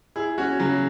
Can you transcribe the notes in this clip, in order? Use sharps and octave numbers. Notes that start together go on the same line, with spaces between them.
E4 G#4
C#4 F#4
C#3 F#3